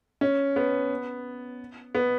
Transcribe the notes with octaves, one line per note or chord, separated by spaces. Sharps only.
C#4
B3
B3